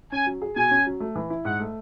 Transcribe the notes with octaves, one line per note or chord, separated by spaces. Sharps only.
C#4 G#5
F#3
G#4
B2 G#5
C#4
F#3
A3
E3
E4
G#2 F#5
A3